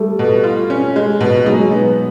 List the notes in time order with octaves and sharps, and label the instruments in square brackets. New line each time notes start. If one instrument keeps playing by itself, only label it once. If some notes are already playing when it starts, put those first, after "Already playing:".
Already playing: [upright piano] G3 A3
[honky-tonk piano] B2
F4
C#4
G#3
B2
[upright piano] F#3 G#3 [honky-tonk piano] D#4
[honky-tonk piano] B3